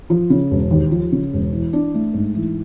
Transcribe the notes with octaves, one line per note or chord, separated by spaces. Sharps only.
F3
C#3
E1
D#2
F3
C#3
E1
E3
D4
A3
G#2
E3